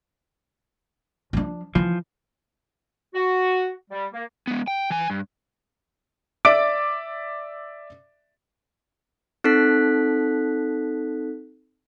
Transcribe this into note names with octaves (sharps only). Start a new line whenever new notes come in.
F3 D4
E3 F3
F#4
G3
A#3
G#3 B3
G5
E3 G#5
G2
D5 E5 D6 A6 D7
C4 D#4 A4 F#6 B6